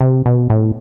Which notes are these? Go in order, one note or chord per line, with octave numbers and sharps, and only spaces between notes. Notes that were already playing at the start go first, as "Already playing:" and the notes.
C3
B2
A2